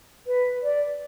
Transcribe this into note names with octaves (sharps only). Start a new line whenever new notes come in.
B4
D5